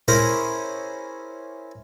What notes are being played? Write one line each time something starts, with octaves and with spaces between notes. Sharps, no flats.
C#4 E4 G#4 A#4 C5